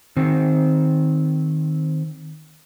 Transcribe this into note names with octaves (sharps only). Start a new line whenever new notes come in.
D#3 C4